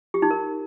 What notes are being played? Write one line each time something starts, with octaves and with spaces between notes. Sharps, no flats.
G4
D#4
A#4